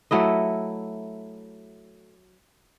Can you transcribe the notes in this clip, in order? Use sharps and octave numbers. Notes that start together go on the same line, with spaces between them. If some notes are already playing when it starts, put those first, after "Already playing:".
F#3 A3 E4 D#5